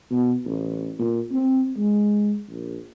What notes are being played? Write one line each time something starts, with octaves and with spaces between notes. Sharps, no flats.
B2
A1
A#2
C4
G#3
A#1